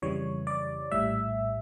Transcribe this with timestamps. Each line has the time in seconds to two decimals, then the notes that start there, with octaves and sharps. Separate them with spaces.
0.02 F2 C#3 E3 G3 C#5
0.47 D5
0.91 A#1 A2 G3 E5